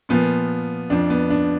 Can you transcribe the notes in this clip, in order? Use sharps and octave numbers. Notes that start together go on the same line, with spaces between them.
A#2 F3 B3
F2 F3 D4
B3
D4